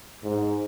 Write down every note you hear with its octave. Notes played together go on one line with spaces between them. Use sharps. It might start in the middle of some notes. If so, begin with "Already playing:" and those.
G#2